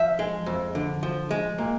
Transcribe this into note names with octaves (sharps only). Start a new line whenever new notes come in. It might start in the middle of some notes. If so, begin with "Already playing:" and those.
Already playing: F3 E5
G#3
F2
D3
F3
G#3
A#2